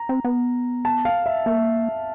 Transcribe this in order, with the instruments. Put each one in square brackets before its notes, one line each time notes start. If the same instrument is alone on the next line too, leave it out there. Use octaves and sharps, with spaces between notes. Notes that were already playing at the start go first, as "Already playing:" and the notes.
Already playing: [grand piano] A#5
[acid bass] C4
B3
[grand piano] A5
F5
E5
[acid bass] A#3 [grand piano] E5